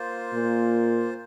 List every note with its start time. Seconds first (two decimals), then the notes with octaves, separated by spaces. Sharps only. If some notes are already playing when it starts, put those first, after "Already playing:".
Already playing: A#3 F4 C5
0.33 A#2